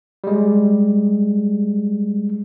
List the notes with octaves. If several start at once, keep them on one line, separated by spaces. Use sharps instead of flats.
G3 G#3